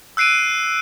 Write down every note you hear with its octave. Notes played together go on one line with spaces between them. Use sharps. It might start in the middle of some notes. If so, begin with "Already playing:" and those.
E6 F#6 C7 D7 D#7